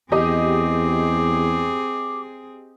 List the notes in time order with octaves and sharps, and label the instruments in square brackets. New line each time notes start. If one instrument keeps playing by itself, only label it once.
[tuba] E2 [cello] C4 G#4 [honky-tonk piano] G4 D#5 [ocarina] D6